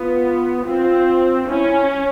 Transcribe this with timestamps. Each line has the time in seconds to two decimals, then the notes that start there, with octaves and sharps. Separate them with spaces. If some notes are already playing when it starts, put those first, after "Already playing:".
Already playing: B3 F4
0.66 C4 F4
1.47 C#4 E4